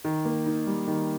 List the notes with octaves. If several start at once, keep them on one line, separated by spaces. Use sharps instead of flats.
D#3
A#3
D#4
G3
D#3